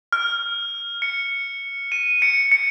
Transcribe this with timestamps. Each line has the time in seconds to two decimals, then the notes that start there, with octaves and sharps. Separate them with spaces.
0.13 F6
1.02 C#7
1.92 D#7
2.22 C#7
2.52 C#7